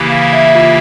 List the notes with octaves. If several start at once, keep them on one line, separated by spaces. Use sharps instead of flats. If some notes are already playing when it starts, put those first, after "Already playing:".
Already playing: C#3 E3 A#3 E4 G4
F5
E5
F4